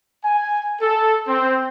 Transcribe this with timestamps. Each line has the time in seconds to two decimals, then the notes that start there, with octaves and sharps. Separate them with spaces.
0.24 G#5
0.80 A4
1.27 C4